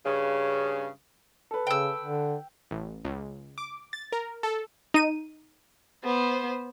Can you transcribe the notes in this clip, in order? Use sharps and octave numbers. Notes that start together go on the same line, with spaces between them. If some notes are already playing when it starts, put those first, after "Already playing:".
G2 C#3
A4 B4
C#3 G5 E6
D3
A1
C#2
D6
A6
A#4
A4
D#4 D#7
B3 C5